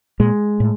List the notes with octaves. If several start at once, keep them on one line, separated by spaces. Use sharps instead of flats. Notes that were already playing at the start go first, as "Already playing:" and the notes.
A#2 G#3
A2